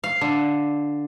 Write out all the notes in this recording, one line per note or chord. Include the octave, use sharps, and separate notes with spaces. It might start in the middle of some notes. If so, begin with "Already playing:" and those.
F5
D3